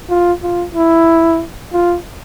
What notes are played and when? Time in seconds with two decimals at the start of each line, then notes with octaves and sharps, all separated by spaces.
0.10 F4
0.43 F4
0.75 E4
1.73 F4